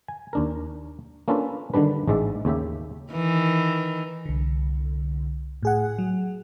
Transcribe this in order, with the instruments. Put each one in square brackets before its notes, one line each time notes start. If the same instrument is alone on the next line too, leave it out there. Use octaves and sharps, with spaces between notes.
[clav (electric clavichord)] G#5
D#2 D4 A#4
A#3 C#4 D4 F4 A4 B4
D3 D#3 G3 D4 B4
A1 G#2 G#3 D5 E5
D#2 C#3 G4 E5
[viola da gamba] D#3 E3
[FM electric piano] C2 D3
A2 G#4 F#5
F#3